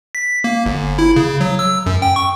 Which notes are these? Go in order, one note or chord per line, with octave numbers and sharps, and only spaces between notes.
B6
A#3
G1
E4
C#3
F#3
E6
F#2
G5
C#6